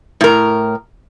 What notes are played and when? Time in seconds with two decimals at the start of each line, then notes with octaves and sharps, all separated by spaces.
0.21 A2 A#4